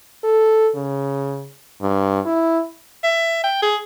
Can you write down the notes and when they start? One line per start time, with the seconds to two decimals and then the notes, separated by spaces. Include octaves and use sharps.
0.24 A4
0.75 C#3
1.82 G2
2.26 E4
3.04 E5
3.44 G5
3.62 G#4